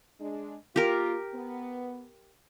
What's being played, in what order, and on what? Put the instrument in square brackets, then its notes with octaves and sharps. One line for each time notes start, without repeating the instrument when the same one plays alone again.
[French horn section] G#3 D4
[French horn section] A#3 F4 [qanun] G4 A#4
[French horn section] B3